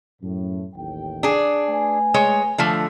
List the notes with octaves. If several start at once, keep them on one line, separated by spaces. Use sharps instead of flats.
F#2 A2
A1 D#2 G5
D4 G#4
A3 B4 G#5
G#3 C#5
D3 F3 A3